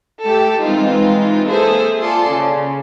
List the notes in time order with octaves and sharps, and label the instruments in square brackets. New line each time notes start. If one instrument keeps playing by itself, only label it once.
[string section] A3 G4 A4
E3 G#3 C4 D#4 F4
A#3 G#4 A4 C5 E5
F4 G#4 A4 D5 A5 C6
C#3